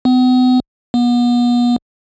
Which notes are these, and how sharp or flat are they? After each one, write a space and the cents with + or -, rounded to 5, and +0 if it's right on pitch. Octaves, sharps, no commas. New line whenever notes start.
B3 +40
B3 -35